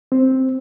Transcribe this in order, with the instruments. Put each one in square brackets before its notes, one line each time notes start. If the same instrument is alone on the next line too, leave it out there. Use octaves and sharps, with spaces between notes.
[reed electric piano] C4